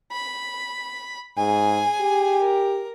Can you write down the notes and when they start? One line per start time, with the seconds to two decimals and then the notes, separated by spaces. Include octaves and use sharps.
0.12 B5
1.38 G#2 G#4 G#5
2.01 G4
2.41 A#4